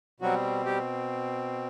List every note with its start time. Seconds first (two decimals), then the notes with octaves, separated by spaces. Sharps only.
0.20 B2 F#3 G3 C4 F#4
0.65 G3 G4